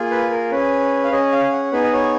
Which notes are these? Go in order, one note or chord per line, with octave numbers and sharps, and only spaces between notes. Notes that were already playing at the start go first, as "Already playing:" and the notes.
Already playing: A#3 F4 G#4
B4
A#4
C#4 G#4 B4
F5
C#4 G#4 D#5
F5
F#5
B3 D#4 G#4 B4
D#5
C#5